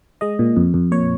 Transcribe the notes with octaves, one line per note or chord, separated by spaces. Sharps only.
G#3 D#5
A#2
F2
F2
A#2 C#5